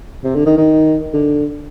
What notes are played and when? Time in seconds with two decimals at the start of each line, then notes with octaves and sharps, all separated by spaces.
0.24 C3
0.35 D3
0.46 D#3
0.57 D#3
1.14 D3